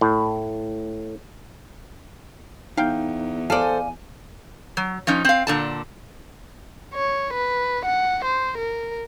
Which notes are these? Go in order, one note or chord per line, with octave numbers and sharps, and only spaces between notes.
A2
E2 D#4 F5 G5
A4 C5 D5 F5 G#5
F#3
F3 C#4 D#4
C4 F5
A#2 D3 A5
C#5
B4
F#5
C5
A#4